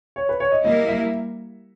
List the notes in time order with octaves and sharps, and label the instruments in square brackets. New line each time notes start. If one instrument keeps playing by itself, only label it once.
[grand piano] C#5
B4
C#5
D#5
[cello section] G3 A#3 E4 A#4 [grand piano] D#5
[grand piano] E5